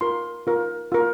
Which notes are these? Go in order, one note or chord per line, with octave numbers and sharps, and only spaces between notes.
F4 A#4 C6
F4 A#4
F4 A#4